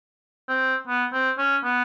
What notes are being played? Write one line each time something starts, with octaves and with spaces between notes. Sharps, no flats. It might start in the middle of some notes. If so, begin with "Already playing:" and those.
C4
B3
C4
C#4
B3